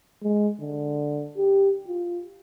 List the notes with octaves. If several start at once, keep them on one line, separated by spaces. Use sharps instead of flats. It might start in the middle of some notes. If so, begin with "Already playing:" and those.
G#3
D3
G4
F4